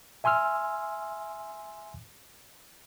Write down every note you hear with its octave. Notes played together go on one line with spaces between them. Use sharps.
E5 G#5 C6 E6 F6